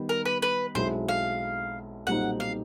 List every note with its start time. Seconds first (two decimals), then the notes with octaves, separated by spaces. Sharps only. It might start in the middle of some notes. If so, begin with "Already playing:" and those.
Already playing: D#3 G3 B3
0.09 A#4
0.25 B4
0.42 B4
0.75 B1 B2 G#3 C4 E4 C5
1.09 F5
2.07 B1 A#2 G3 C4 D#4 F#5
2.40 F5